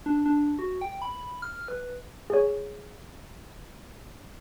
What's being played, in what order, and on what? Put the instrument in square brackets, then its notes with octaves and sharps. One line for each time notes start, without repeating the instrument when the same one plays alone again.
[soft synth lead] D4
D4
F#4
G5
B5
F6
B4
[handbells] G#4 C#5